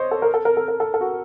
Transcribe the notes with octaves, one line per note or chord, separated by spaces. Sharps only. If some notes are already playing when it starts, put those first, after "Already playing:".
Already playing: C5 C#5 D#5
A4
A#4
A4
A#4
A4
A#4
A4
A4
F#4